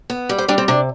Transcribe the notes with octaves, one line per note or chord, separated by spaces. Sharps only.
B3
G3
C5
G3 D4
C4
C3 D4